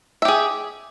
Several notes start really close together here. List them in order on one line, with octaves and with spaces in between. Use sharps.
E5 G4 G#4